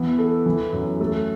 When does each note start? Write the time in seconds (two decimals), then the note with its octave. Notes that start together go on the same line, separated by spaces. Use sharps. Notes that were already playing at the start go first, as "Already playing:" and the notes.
Already playing: E3 B3
0.19 A4
0.46 E3
0.73 F#2
1.00 A3